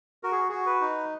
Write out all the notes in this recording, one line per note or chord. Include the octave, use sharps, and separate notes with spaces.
F#4 A#4
G#4
F#4 G#4
B4
D#4